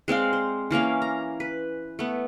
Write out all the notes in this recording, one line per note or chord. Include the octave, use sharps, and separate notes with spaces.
G#3 C4 D5 F5
C5
E3 A#3 C#4 F5
A#5
B4
A3 B3